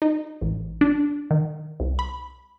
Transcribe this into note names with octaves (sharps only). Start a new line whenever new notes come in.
D#4
A1
D4
D#3
C2
B5